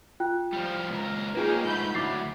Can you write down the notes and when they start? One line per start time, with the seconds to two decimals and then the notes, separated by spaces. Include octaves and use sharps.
0.20 F4 G5 F#6
0.53 F3 G3
0.90 C#2 A#4
1.35 A#3 C#4 D#4 F4 G#4 B4 G5
1.64 G#2 A3 B5 G6
1.94 D2 F#3 E4 D6 A6 C7